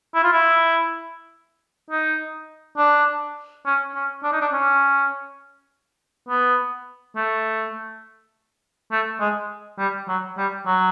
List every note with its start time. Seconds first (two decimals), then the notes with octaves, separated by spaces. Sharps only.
0.15 E4
0.24 F4
0.32 E4
1.91 D#4
2.78 D4
3.66 C#4
3.95 C#4
4.23 D4
4.32 D#4
4.41 D4
4.53 C#4
6.29 B3
7.16 A3
8.92 A3
9.20 G#3
9.79 G3
10.08 F#3
10.38 G3
10.66 F#3